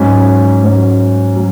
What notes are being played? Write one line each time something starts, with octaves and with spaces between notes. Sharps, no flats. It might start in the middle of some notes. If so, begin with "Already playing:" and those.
Already playing: G#2 F#3 C#4
G#2 F#3 C#4
F#3